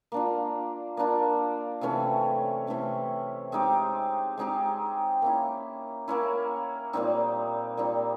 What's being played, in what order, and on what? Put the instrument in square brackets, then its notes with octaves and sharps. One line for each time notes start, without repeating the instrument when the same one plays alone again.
[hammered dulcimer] A#3 D4 F4
A#3 D4 F4
C3 E3 A3 C#4
C3 E3 A3 C#4
G#3 C4 D#4 G4
G#3 C4 D#4 G4
A#3 C#4 E4
A#3 C#4 E4
A#2 G3 C4 D#4
A#2 G3 C4 D#4